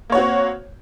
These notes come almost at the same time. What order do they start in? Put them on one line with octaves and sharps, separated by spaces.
A#3 C#5 F#4 C4